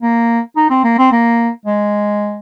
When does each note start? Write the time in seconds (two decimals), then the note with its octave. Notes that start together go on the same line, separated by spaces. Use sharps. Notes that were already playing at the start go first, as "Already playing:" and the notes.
0.02 A#3
0.56 D#4
0.70 C4
0.84 A#3
0.98 C4
1.12 A#3
1.66 G#3